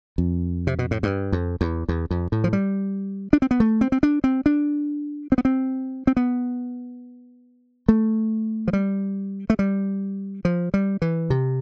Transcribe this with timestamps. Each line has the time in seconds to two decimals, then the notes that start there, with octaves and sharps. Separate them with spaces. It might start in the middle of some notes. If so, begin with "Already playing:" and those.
0.18 F2
0.67 C3
0.79 B2
0.91 A2
1.03 G2
1.32 F2
1.61 E2
1.89 E2
2.11 F2
2.32 A2
2.44 F3
2.53 G3
3.33 D4
3.42 C4
3.51 B3
3.60 A3
3.81 C4
3.92 C4
4.03 D4
4.24 C4
4.46 D4
5.32 C4
5.38 B3
5.45 C4
6.07 C4
6.17 B3
7.89 A3
8.68 F3
8.73 G3
9.50 A3
9.59 G3
10.45 F3
10.74 G3
11.02 E3
11.30 C3